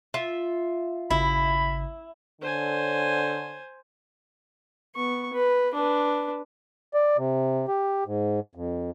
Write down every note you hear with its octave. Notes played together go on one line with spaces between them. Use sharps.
F4 E5
G#1 C#3 E4 B5
D3 C5 C#5 G#5
B3 C#6
B4
D4 B4
D5
C3
G4
G#2
F2